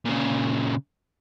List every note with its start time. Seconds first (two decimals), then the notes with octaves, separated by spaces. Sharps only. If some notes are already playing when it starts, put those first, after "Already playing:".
0.05 A#2 C#3